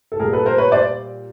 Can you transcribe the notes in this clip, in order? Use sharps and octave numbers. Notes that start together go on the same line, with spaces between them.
A4
A#2 G3 G#4 A#4
A4 B4
A#4 C5
B4 C#5
C5 D5